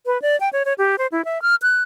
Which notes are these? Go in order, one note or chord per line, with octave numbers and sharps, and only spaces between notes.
B4
D5
G5
C#5
C#5
G4
C5
E4
E5
F6
F#6